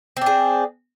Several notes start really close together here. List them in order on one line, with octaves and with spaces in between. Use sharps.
C4 D4 G#4